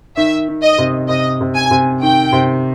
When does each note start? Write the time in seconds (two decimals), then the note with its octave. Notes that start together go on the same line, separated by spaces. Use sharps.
0.17 D#3 E5
0.48 D#3
0.62 D#5
0.78 C3
1.09 C3 D#5
1.41 C3
1.56 G#5
1.71 C3
2.02 D#3 G5
2.33 C3